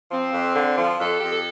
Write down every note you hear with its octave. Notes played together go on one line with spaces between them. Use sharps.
F3 C4
F2
D3
F3
F2 A4
F2 G4
A4